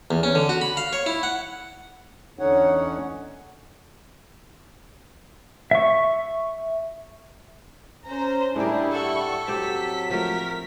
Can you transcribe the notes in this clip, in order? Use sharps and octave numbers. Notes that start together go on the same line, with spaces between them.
E2
C#4
D3
F#4
B5
F5
C#5
E4
F#5
E2 D3 C#4 D#4 C#5 F#5
E5 C#6
C#4 C5 A#5
A2 G3 D4 E4 G4 G#4 A#4
A4 F#5 C#6
F#3 C4 G4 B6
F3 A3 A#4